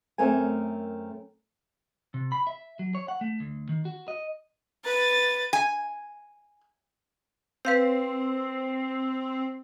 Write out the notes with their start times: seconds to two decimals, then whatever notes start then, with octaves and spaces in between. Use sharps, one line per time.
0.18 F#2 A3 C4 A#4 G#5
2.14 C3
2.32 B5
2.47 E5
2.79 F#3
2.95 C#5
3.08 F#5
3.21 A3
3.40 D2
3.69 D#3
3.85 F#4
4.08 D#5
4.85 B4 A6
5.53 G#5
7.65 C4 B4 F5 G6